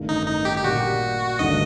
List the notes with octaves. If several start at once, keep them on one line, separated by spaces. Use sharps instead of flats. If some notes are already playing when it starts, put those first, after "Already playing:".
Already playing: A1 G2 D#3 A3
D#4
D#4
G4
G4
A#2 G3 A#3 F#4
G1 G2 D#3 A3 D#5